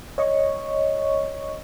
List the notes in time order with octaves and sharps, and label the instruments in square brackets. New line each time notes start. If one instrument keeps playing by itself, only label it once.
[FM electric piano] C#5 D#5 C#6